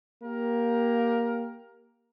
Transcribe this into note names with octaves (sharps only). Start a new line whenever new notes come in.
A#3 G4 A#4